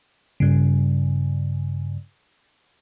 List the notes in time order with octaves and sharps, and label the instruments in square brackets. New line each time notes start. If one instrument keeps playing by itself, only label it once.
[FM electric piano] G2 C#3